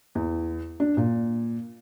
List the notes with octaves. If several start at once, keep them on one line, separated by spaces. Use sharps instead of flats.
E2
D4
A#2